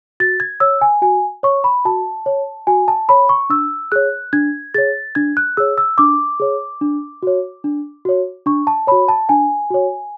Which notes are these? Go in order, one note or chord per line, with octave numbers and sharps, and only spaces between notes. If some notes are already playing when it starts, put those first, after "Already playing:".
F#4 A6
G#6
C#5 E6
G#5
F#4 G#5
C#5 C#6
B5
F#4 A5
C#5
F#4 G#5
A5
C#5 B5
C#6
D4 E6
G#4 C#5 F#6
D4 G#6
G#4 C#5 A6
D4 G#6
F#6
G#4 C#5 E6
E6
D4 D6
G#4 C#5
D4
F#4 C#5
D4
F#4 C#5
D4 C#6
A5
F#4 C#5 B5
A5
D4 G#5
F#4 C#5